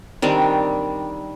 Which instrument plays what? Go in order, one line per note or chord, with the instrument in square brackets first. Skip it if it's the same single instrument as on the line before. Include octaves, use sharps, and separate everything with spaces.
[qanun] D#3 G3 C4 D4